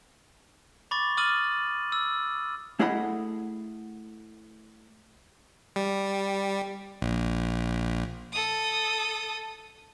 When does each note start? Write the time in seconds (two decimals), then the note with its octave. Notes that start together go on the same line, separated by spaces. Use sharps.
0.91 B5 C#6 D6 A6
1.17 D6 D#6 F6 A6 D#7 F#7
1.92 E6
2.79 A3 E4 G#4 D#5 F#5 B5
5.76 G3
7.02 A#1
8.32 A4 D#6